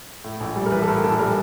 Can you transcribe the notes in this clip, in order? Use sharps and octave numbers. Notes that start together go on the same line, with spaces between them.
A2
A#1
G3
A#4
E3 B4
A4
A2 A#4
A#1 A4
G3 A#4